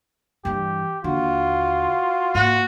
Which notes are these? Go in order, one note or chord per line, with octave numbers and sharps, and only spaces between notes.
G2 E3 G4
D#2 D3 F4 F#4
G#2 A#3 F#4